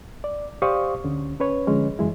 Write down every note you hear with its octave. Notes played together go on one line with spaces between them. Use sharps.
D5
G4 C5 D5 F5 C#6 D#6
D2 D3 C#4
C#4 B4 C#5
D3 F3 G#3 C#4
F#2 E3 G#3 E4